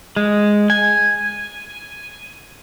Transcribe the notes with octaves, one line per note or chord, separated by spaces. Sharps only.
G#3
G#5